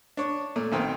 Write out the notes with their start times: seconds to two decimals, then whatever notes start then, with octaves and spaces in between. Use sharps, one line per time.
0.17 D4 C#5
0.56 A#2 A3
0.72 B1 D#3 C4